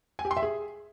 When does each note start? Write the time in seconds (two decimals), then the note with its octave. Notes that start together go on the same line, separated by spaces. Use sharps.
0.19 G#5
0.25 G4
0.31 C6
0.37 E5
0.43 G#4